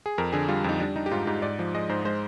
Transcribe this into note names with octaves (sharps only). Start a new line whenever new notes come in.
G#4
F2 A#4
D3 G#4
G3 F4
F2 D#4
G3 D4
G3 D#4
G4
G#2 F4
G#2 G4
G#2 D5
F3
G#3 D#5
G#2 C5
G#3 C5